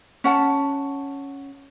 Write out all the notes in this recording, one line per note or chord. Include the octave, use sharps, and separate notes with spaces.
C#4 F#5 A5